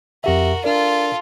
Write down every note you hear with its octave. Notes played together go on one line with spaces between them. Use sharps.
F2 F#4 G4 A#4 E5
D4 F4 A4 A#4 D5